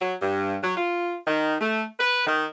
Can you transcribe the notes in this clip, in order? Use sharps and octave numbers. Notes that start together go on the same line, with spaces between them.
F#3
G2
F#3
F4
D#3
A3
B4
D#3